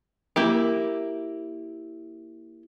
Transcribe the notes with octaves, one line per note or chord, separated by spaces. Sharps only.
A#3 E4 G4